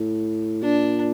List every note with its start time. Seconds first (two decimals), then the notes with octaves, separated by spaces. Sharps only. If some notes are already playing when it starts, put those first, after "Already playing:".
Already playing: A2
0.63 A#2 D4